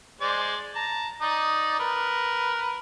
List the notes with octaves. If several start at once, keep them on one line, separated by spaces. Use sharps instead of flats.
G#3 C5 D5
A5 A#5
D#4 D5 D#6
A#4 B4